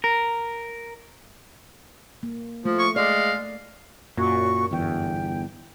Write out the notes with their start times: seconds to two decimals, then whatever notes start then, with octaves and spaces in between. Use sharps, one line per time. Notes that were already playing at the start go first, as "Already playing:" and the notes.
0.04 A#4
2.23 A#3
2.65 F3 A3
2.79 C#6
2.96 G#3 D5 F5
4.17 F#2 A#2 F#4 C#6
4.71 G1 E2 G5